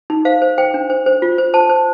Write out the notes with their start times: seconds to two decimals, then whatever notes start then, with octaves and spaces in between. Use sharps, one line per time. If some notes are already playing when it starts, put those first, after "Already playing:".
0.10 D#4
0.25 C5 F5
0.42 C5
0.58 C5 G5
0.74 D4
0.90 C5
1.06 C5
1.22 F4
1.38 C5
1.54 C5 A5
1.69 C5